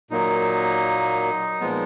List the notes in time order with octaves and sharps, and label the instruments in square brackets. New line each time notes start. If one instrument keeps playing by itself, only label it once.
[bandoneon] A#2 F#3 A#3 D#4
A#2 F3 G#3 B3